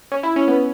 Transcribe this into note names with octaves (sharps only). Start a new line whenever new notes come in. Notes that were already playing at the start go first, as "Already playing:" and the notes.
C#4
E4
C#4
B3